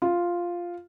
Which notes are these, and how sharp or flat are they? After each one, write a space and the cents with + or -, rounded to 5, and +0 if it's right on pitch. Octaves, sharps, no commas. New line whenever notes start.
F4 +0